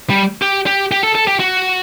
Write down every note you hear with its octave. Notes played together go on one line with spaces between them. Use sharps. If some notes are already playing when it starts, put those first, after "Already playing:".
G3
G4
G4
G4
A4
A4
G4
F#4